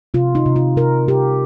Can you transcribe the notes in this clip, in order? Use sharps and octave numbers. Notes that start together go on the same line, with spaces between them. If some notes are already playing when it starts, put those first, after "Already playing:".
C3 F4
D#4
C3
F4
C3 A#4
C3 G4